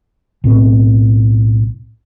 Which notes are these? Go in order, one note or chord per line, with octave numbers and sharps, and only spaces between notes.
B1 A2 C4